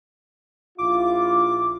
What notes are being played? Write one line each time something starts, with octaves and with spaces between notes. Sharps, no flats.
A#1 E4 F4 D6